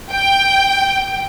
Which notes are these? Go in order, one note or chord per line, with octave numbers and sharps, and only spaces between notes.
G5